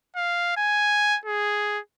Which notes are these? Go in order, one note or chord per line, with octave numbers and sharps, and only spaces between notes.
F5
G#5
G#4